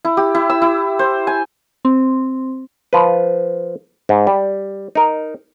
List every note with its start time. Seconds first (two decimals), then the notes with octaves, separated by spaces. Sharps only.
0.05 E4
0.17 G4
0.35 E4
0.50 E6
0.62 E4
0.99 C5
1.27 G#5
1.85 C4
2.93 F3 B4
4.09 G#2
4.27 G3
4.95 D#4 A#4